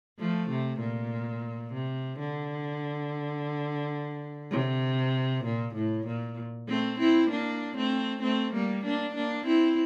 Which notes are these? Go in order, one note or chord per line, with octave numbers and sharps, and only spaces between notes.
F3 A3
C3
A#2
C3
D3
C3
A#2
A2
A#2
A3 C4
C4 E4
A#3 D4
A3 C4
A3 C4
G3 A#3
A#3 D4
A#3 D4
C4 E4